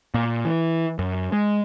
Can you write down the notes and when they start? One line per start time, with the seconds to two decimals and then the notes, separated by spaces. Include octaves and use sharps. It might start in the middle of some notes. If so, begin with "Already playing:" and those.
0.14 A#2
0.45 E3
0.99 F#2
1.32 G#3